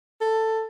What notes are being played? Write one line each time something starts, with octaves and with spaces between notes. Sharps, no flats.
A4